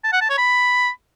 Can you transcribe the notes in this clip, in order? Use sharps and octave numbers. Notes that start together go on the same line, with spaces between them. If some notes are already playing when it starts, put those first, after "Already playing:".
A5
F#5
A5
C#5
B5